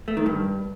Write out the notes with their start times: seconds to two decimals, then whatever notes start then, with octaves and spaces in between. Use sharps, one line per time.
0.08 A3
0.17 D#3
0.26 G2